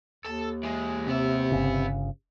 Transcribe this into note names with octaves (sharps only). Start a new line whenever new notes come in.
D#2 A4 A5
E3 G#3
C3 B3 E5
G1 C#3